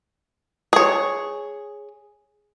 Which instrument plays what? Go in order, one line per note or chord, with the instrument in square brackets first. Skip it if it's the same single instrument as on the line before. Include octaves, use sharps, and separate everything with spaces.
[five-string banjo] G#4 C#5